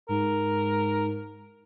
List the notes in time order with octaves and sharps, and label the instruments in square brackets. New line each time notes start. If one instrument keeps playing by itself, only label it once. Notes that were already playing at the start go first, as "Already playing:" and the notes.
[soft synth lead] G#2 [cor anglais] A#4